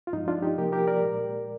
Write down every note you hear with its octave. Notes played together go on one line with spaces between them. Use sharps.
F4
G2 F3 G#3 D#4
D4 F4
D#4 G4
C3 F3 A#3 G4 A#4
G4 A#4
A#4 D5
A#2 G#3